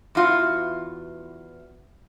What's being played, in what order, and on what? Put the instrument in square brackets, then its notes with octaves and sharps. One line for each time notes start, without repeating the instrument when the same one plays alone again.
[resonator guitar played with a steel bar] E2 E3 F4 F#4